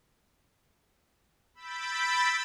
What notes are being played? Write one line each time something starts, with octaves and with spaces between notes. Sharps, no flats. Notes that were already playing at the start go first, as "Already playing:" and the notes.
B5 E6 G6 A6 B6 D7